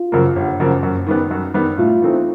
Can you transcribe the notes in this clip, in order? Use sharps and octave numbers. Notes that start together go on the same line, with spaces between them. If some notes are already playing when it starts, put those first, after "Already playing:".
Already playing: F4
F#2 C#3 F3 A#3
G1
F#2 C#3 F3 A#3
F#2
D#3 G3 B3
F#2
D#3 G3 B3
A2 F4
E3 A3 C4 D#4